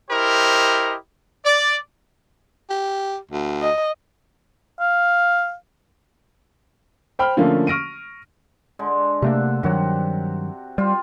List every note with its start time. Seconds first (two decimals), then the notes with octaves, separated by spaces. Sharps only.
0.10 E4 G4 A#4 C5 D#5
1.45 D5
2.70 G4
3.31 D2
3.62 D#5
4.80 F5
7.19 C5 G5 B5 F6
7.37 D3 F3 A3 A#3 C#4
7.67 C#6 F6 A#6 D7 D#7
8.79 D3 G#3
9.22 C3 A3 A#3 D4 E5 F#5
9.63 G2 C3 D#3 F#3 F#4
10.78 G3 F4 G4 C5